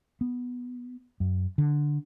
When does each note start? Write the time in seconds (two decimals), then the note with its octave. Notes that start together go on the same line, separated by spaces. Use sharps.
0.21 B3
1.20 F#2
1.58 D3